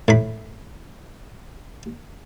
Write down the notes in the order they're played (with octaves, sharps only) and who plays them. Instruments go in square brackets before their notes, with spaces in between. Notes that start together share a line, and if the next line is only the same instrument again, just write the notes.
[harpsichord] A2 B5